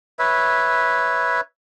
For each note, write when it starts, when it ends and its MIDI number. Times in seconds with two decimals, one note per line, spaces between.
0.19 1.41 71
0.19 1.41 73
0.19 1.41 76